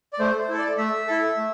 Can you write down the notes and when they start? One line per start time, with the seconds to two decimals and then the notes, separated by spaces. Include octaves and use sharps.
0.13 D5
0.19 A3 C5
0.39 C5
0.49 E4 A4
0.59 D5
0.78 A3 E5
1.07 E4 A4
1.37 A3